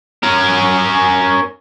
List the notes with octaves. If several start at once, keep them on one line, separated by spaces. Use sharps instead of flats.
C#4 A#4